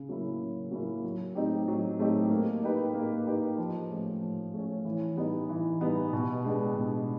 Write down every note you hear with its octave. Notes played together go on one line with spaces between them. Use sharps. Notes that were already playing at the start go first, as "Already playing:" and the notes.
Already playing: C#3
F#3 A#3 C#4 E4
C#3
F#3 A#3 C#4 E4
F#3
A3 C4 D#4 G4
F#3
A3 C4 D#4 G4
A#3
D#4 G4 B4
A#3
D#4 G4 B4
F3
A3 C#4
F3
A3 C#4
E3
G3 B3 D#4
E3
G3 B3 D#4
B2
G#3 B3 D4 G4
B2